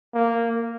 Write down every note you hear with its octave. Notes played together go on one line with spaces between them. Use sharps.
A#3